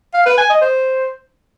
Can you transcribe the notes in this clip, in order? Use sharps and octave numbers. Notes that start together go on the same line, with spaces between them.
F5
B4
G#5
D#5
C5